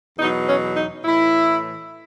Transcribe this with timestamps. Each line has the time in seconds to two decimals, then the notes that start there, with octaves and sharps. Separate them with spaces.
0.18 E2 B2 F#3 D#4
0.47 C#4
0.76 D#4
1.05 A2 E3 E4